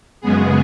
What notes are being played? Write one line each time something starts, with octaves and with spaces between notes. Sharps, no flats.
F#2 C#3 G#3 B3 G#4